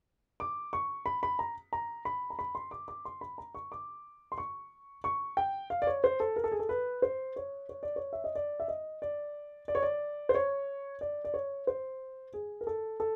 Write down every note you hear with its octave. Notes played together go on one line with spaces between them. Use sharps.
D6
C#6
B5
B5
A#5
A#5
B5
A#5
B5
C6
D6
D6
C6
B5
A#5
C#6
D6
C6
C#6
C#6
G5
F5
D5
C#5
C5
A4
A#4
A4
G#4
A4
B4
C5
C#5
C#5
D5
C#5
E5
D#5
D5
E5
D#5
D5
D5
C#5
D5
C5
C#5
D5
D5
C#5
C5
G#4
A#4
A4
A4